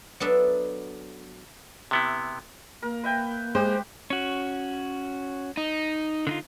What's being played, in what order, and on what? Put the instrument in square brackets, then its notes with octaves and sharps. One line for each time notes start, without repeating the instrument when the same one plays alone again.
[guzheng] F#3 B3 D4 A4 E5
[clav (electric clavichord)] C3 B3 E4
[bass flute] A#3 [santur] A#4
[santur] B4 E5 G5
[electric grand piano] G#3 [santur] G4 [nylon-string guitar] C5
[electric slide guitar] C#4 F#4
[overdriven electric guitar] D#4
[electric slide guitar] D3 D#4 F4